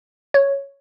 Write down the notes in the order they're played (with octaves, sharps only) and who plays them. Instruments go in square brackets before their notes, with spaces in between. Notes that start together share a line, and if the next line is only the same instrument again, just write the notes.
[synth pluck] C#5